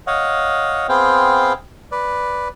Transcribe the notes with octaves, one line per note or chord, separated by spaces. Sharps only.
C#5 D#5 F5 F#5
B3 C4 G#4 C5 F5 G5
B4 D5